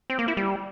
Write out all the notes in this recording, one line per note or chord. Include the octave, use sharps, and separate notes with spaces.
C4
A#3
E4
G3